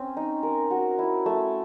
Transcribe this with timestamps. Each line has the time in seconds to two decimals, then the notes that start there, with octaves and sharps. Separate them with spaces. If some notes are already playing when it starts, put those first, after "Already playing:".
Already playing: C4 C#4
0.17 D#4
0.43 A#4
0.71 F#4
0.99 E4
1.26 A3